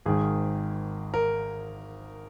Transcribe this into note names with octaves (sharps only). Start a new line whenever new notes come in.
G#1 G#2 D#3 G#4
A#4